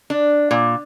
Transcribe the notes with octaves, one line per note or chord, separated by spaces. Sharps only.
D4
A#2